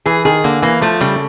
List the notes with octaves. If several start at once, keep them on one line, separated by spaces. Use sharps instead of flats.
E3 G#4
D#3 G#4
D3 A#3
E3 A#3
F3 A3
C#3 G3